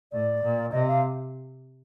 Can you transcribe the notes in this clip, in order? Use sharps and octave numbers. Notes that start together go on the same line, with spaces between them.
A2 D5
A#2
C3 D#5
F5